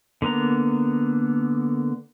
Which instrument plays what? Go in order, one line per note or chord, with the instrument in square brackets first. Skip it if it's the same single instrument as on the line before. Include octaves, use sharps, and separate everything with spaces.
[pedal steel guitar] D3 A#3 B3 A#5